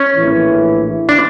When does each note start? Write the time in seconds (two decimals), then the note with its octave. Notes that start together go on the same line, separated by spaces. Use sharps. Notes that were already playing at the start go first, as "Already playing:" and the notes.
Already playing: C#4
0.15 A#1 A2 E3
1.09 D4